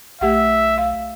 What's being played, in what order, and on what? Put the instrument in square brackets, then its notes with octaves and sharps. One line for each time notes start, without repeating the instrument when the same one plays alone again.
[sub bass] B1 [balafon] A3 G4 F#5 [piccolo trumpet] E5
[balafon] F5